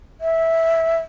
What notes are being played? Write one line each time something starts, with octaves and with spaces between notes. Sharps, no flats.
E5